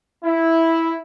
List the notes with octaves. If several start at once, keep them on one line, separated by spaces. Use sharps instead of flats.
E4